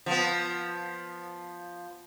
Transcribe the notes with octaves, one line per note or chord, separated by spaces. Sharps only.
F3 B3